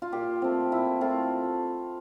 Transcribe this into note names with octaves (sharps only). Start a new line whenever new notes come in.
F4
A#2 G4
A3 C4
A#2 E4
A3 C4 F4